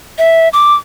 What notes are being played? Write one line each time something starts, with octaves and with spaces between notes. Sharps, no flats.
E5
D6